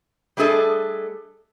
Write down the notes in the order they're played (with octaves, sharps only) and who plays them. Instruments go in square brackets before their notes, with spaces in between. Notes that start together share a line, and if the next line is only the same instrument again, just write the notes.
[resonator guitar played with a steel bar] G3 A3 D4 G#4 A4 D#5